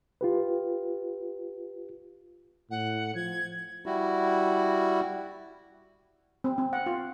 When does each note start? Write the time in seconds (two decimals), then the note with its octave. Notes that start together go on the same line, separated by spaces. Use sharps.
0.21 F4 G4 B4
2.71 A2 F#5
3.15 F3 G#6
3.86 G3 E4 F#4
6.44 C4
6.58 C4
6.73 F#5
6.86 F4